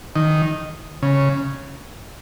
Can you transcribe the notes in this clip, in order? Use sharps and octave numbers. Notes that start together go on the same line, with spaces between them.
D#3
C#3